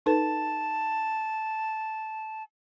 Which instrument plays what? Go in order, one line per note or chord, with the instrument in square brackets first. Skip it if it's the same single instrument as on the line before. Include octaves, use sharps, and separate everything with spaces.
[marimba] D#4 A4 B4 [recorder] A5